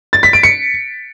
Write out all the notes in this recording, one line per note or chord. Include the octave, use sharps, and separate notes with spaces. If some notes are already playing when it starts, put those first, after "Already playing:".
A6
B6
D7
C#7